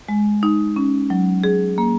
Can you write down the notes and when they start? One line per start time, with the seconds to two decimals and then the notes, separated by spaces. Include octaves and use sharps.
0.09 G#3
0.43 D#4
0.76 C#4
1.10 F#3
1.44 G#4
1.78 A#3